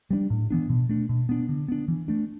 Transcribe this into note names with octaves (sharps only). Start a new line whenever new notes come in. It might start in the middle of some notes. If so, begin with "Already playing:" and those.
G3 B3 D4
A2
E3 B3 D4
B2
A3 D4
B2
B3 D4
D3
B3 D4
E3
A3 D4